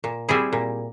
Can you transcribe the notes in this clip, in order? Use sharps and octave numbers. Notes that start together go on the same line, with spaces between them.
A#2
G3 C4 E4 G#4
A#2